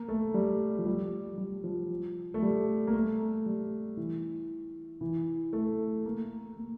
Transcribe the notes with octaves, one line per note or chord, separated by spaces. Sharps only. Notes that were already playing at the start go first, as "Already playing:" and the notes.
Already playing: A#3
A3
G3
F3
G3
G3
F3
A3
G3
A#3
A3
G3
E3
E3
A3
A#3
A#3